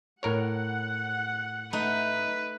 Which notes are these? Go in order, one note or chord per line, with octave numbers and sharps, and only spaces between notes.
A2 A#4 C#5 F#5
A3 D#4 B4